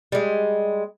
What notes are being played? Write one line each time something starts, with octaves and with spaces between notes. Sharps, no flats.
G3 G#3